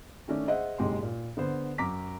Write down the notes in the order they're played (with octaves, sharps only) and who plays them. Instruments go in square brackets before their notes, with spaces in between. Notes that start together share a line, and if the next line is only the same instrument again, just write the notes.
[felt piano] D#3 A3 C#4 D4
G#4 C5 D#5 E5 F#5
F#1 B1 G#3 G4 C6
A#2
D3 B3 C5
F#2 A#5 D6 B6